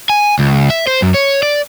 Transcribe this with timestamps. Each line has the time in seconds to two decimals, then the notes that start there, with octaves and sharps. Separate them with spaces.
0.10 G#5
0.39 C#2
0.70 E5
0.87 C5
1.02 F#2
1.14 C#5
1.43 D5